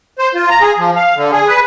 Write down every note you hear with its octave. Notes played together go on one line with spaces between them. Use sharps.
C5
F4
A#5
G#4
F3
F5
D3
G#4
B4